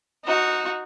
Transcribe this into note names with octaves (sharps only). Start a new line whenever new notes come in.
D#4 F#4